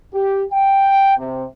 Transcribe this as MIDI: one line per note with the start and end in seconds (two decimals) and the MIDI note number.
0.14 0.44 67
0.52 1.17 79
1.17 1.44 48